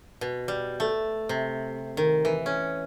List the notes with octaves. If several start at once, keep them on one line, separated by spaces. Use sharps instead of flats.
B2
G3
A3
C3
D#3
E3
C#4